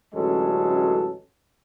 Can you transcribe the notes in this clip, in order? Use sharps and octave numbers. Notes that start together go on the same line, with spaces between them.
A1 D2 F#3 G#3 C#4 A4